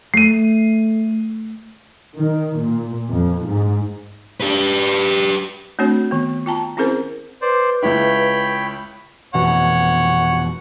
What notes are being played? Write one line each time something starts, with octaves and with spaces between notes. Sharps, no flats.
A3 C7 D#7
D#3
A#2
F2
G#2
G4 B4
A3 C4 D4 F#4 C#5
D#3 B3
F4 G5 A5 A#5
C4 C#4 E4 G#4 A#4 C5
B4 C5 D5
C#2 E4 C#5 G5 B5
F1 B2 E3 C#5 F#5